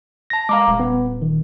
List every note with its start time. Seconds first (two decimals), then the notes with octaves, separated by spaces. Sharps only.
0.30 A5 A#6
0.49 G#3 F5 A#5 D6
0.68 D#1
0.80 B3
1.22 D#3